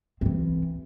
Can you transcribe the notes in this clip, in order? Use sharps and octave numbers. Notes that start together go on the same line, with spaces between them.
E3 C4